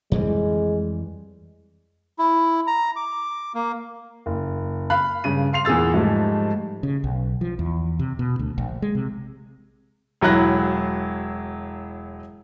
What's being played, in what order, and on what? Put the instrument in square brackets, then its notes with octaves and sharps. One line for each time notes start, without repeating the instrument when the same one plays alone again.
[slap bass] F2 E3 G3 [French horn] G#3
[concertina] E4
A#5
D6
A#3
[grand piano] F#1
F5 B5 F#6
G2 C#3 D#7
F5 C6 C7 F7
E2 A#2 G#4 E6 A6
G#2 F3 G3 A3
[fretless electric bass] C#3
B1
F3
E2
C3
B2
D2
A#1
G#3
C3
[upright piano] E1 F#3 E4 F#6 A#6